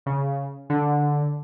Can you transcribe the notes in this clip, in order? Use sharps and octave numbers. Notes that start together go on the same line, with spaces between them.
C#3
D3